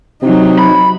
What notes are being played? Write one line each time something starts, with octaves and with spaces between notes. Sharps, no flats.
C3 F#3 D#4
B5